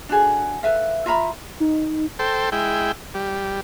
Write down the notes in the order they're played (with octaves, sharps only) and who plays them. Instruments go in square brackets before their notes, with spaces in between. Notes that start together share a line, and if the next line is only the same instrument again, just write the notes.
[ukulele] D4 F#4 G#4 A4
A4 B4 E5 F5
F4 E5 A#5 B5
[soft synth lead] D#4
[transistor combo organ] A4 C5 G5
G#3 E4 G5
G3